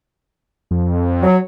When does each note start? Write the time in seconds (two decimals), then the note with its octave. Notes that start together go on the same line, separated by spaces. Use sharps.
0.71 F2
1.23 F#3